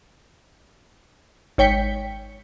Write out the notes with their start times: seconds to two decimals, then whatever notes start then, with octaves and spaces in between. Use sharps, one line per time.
1.58 G#1 C#5 G5 B6 C#7